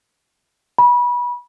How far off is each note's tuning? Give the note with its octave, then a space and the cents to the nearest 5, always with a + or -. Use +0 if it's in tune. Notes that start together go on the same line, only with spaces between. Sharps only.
B5 -25